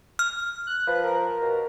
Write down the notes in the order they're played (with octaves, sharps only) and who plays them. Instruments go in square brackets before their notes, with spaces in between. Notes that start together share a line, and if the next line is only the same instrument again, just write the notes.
[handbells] F6
[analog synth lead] F#6
[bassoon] F3 [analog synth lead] B4
[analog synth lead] A#4
[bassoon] B2